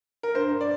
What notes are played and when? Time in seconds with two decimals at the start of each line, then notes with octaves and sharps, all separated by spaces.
0.23 A#4
0.34 G2 C5
0.52 G2
0.61 D5